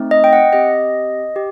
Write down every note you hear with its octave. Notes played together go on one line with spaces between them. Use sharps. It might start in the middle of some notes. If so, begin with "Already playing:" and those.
Already playing: A3 C4 D#4
D#5
G5
F#5
C4 G4 D#5
G4